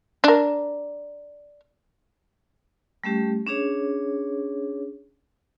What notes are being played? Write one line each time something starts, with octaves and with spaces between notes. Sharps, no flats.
D4 A#4
G3 A3 C#4 G4
C#4 D4 G#4 C#5